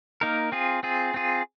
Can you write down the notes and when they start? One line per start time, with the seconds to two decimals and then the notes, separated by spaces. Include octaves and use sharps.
0.21 A#3 D#4 A#4
0.52 C4 F4 G#4
0.83 C4 F4 G#4
1.14 C4 F4 G#4